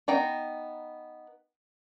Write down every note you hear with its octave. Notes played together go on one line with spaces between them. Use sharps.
B3 D#4 G5 A#5